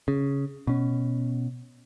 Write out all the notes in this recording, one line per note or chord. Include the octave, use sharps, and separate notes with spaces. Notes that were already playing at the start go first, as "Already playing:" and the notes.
C#3
B2 C#4